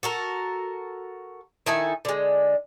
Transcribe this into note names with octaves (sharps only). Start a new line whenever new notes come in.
F#4 A4 A#4
D#3 E4 A4 G#5
D3 G#3